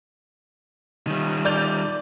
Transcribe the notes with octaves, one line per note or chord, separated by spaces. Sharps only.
D#3 G3
D5 G6 F7